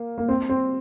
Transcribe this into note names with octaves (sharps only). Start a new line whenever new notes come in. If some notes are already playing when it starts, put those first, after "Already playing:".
Already playing: A#3
A#3
C4
C4